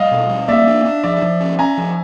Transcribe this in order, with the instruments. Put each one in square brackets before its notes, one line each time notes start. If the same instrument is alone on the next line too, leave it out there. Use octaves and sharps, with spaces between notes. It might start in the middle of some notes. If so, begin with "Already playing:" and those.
Already playing: [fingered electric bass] G3 [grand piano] D#5 F5
[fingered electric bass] B2
G3
[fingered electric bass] A#3 [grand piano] D5 E5
[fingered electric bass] D4
D4
[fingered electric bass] F3 [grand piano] D5 E5
[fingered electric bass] F3
C#4
[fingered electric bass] C#4 [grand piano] G#5 A#5
[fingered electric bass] F3